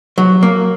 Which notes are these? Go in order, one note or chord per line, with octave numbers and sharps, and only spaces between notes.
F#3
A#3